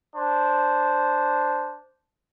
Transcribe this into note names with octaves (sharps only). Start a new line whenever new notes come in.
D4 C5